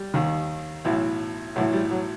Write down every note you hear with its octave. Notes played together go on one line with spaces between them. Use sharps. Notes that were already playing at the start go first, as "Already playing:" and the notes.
Already playing: G3
D#2 D#3
B1 A2 E3
B1 A2 E3 F#3
G3
F#3